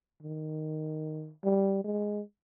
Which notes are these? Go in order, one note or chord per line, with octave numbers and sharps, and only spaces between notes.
D#3
G3
G#3